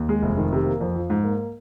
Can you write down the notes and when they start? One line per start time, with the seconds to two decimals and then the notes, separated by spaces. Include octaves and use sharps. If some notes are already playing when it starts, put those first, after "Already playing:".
Already playing: D#2
0.09 G#3
0.22 F1
0.37 D#3
0.52 C3
0.66 A#3
0.81 F2
0.95 F3
1.10 G#2
1.24 A#3